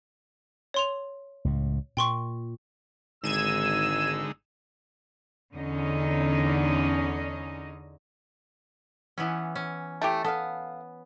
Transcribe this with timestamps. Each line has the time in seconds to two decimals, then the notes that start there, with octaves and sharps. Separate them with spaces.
0.74 C#5 C6 F7
1.45 C#2 A2
1.97 A#2 G5 C6 C#6
3.24 G#1 D3 G#3 D#4 E6 G#6 D#7 E7
5.54 E2 D3 C#4 D#4 D#5
9.18 E3 B3 C#4
9.55 C#4
10.02 A3 E4 G4
10.24 B3 A4 F5